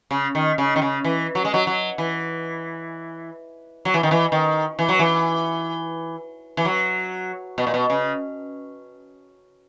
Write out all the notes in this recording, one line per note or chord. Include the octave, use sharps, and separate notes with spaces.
C#3
D#3
C#3
D#3
C#3
E3
F#3
G#3
F#3
F#3
E3
F#3
E3
D#3
E3
D#3
E3
F#3
E3
E3
F#3
B2
A#2
B2
C#3